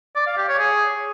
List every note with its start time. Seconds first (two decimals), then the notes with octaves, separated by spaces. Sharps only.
0.16 D5
0.27 F5
0.37 G4
0.48 C#5
0.59 G#4